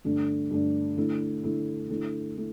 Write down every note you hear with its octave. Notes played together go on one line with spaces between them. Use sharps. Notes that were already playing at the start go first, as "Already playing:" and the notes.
G2 D3 A3 D4
G2 D3 A3 D4
D3 A3 E4
D3 A3 E4
D3 A3 E4
A3 E4